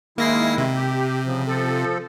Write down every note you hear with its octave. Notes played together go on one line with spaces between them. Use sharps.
D#3 G#3 A#3 E4 A#6 C7
C3
G4
C#3 F3
F3 A4